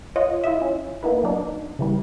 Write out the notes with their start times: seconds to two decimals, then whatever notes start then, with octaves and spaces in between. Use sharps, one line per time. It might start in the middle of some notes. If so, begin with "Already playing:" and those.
0.16 F4 C#5 D#5 F#5
0.44 E4 F4 D#5 E5
0.62 C#4
1.03 A#3 B3 D#4 E4 B4
1.24 F#3 B3 D4 D#4
1.79 C#3 E3 G3